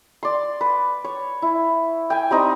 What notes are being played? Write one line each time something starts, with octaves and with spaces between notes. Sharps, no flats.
D5 C6
B4
C#5
E4
G5 G#5
G3 C4 D#4